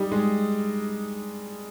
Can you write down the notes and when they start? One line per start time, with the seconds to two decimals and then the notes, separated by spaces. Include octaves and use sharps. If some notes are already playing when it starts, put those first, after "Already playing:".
Already playing: G3 D#4
0.12 G#3